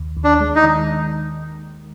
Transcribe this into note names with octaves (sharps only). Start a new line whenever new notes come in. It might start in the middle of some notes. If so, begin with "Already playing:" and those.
Already playing: D#2
D#2
D4
G#3
D#4
D#3